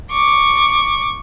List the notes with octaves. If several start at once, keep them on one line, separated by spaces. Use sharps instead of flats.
C#6 D6